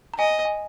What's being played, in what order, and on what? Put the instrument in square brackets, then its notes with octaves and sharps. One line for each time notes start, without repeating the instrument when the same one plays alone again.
[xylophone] A#5
[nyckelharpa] D#5 [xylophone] G#5
[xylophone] G#5